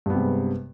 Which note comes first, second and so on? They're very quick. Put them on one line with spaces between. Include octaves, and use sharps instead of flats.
G2 B3 C3 G#3